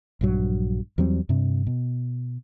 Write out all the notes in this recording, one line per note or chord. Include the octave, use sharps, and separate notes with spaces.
A#1 G2 F#3
E2 F#3 G3 C4
G2 C3
B2